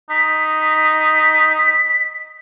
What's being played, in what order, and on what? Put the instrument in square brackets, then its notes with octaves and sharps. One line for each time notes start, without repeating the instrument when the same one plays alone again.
[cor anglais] D#4 [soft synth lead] B6